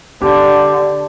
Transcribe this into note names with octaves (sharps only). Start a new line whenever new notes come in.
D3 G4